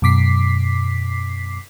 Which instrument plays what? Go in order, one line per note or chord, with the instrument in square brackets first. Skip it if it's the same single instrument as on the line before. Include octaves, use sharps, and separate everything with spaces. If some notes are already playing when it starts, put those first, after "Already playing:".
[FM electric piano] F#2 B2 D6 B6 C7